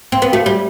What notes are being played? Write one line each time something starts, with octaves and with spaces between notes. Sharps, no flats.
C4
B3
A3 F#4
G3